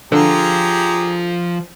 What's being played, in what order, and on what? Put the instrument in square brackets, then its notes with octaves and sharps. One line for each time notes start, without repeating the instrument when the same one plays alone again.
[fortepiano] D3 [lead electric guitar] F3 F4 [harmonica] G4 G#4 A#5